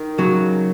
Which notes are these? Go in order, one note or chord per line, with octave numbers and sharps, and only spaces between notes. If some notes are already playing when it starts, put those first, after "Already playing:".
Already playing: D#3
C#3 F#3